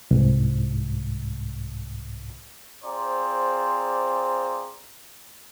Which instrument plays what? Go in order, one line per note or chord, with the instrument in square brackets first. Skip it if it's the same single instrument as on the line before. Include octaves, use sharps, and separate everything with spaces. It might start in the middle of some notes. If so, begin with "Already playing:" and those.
[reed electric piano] C2 G#2
[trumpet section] C4 F4 G#4 C5 D5 A#5